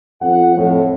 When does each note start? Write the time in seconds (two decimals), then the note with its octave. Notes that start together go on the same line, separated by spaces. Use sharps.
0.22 F2 F#5
0.56 F2 A2